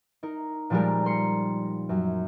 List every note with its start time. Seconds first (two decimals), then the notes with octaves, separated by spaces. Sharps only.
0.23 D#4 A#4
0.70 A#2 F3 G3 G#3 G4 A#4
1.05 A#4 C6 C#7
1.89 F#2 F#3